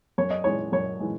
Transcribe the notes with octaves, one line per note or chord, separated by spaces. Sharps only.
F#2 C#5
D#5
E3 G#3 C#5
F#2 C#5
E3 G#3